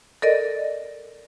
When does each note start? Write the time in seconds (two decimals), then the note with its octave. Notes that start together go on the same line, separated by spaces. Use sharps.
0.22 A4 A#4 D5 D#5